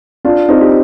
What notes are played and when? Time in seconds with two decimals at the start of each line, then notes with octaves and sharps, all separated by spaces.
0.25 D4 F4
0.49 C4 D#4
0.61 G4